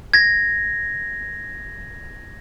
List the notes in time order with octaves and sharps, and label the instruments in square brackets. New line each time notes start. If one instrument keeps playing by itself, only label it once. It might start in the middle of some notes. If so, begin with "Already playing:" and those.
[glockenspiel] G#6 A#6